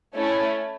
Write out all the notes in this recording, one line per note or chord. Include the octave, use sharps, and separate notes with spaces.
A3 C#4 E4